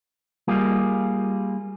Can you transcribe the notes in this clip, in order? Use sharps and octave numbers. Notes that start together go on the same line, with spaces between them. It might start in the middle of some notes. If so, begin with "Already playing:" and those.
G3 A#3 F4 G#4